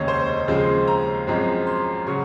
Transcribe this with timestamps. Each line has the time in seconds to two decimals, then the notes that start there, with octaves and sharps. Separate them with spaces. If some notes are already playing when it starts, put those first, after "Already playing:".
Already playing: F1 D#2 C#3 G#3 C#5 D#5
0.08 C5
0.48 D#2 C#3 F3 G#3
0.88 A#5
1.27 G#1 F#2 F3 G#3 C4
1.67 C6
2.07 C#3 F#3 C#6